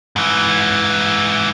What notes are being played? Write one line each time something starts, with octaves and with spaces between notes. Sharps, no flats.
G#2 E3